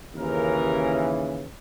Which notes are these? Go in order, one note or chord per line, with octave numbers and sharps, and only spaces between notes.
D#2 C#3 E3 A#4